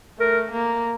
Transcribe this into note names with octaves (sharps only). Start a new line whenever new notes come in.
A3 A#4
A#3